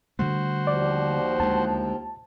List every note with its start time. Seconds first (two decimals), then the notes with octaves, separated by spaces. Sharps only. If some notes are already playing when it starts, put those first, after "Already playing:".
0.19 D3 G3 A3 F#4 C5
0.67 D#2 F3 D5
1.40 D2 G#3 A5